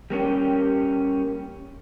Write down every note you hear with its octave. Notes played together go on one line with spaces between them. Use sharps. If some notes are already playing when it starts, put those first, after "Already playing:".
G3 A#3 C#4 G4